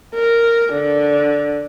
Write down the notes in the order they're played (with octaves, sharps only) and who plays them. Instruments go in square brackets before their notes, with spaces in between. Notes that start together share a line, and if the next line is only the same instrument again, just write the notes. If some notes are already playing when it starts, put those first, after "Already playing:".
[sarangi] A#4
D3